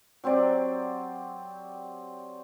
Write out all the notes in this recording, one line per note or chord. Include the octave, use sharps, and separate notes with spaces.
F#3 C4 G4 D5